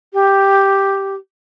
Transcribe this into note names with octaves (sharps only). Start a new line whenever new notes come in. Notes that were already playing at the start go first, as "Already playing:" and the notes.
G4